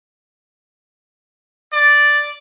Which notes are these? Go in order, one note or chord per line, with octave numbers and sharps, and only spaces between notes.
D5